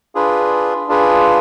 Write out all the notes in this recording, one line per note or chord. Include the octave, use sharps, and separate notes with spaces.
D4 F4 G#4 B4
D4 F4 G#4 B4